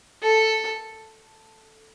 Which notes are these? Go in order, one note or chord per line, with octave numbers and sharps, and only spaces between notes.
A4